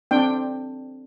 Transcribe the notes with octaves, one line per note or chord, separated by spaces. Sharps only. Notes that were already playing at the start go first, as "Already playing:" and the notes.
C4 D4 G5